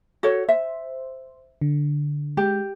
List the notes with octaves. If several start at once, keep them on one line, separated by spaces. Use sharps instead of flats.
F#4 A4 C#5
C5 E5
D3
G#3 G4